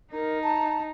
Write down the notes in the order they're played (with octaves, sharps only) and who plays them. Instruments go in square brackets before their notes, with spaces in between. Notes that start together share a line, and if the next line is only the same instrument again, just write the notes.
[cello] D#4 [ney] A#4
[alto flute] A5 [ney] A#5